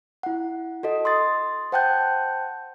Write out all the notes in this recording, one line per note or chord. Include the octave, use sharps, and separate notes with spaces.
E4 F#5
F#4 A4 D#5
C6 D#6 A6
C5 F#5 G5 A5 F#6 G6